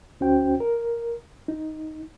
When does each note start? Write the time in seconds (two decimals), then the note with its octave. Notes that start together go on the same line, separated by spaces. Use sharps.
0.20 D2 C#4 F#4 C5 G5
0.60 A#4
1.48 D#4